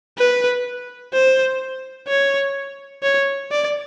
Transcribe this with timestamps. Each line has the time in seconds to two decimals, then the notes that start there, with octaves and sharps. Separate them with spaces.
0.18 B4
1.13 C5
2.08 C#5
3.03 C#5
3.51 D5